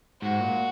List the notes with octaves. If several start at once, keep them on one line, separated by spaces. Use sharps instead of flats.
G#2 F#4
A#2